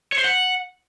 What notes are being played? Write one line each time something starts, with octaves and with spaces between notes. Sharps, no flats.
C#5
C5
F#5